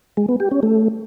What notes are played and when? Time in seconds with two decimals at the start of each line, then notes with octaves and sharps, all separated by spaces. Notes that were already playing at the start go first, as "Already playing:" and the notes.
0.17 G#3
0.29 B3
0.40 G4
0.51 C#4
0.63 A3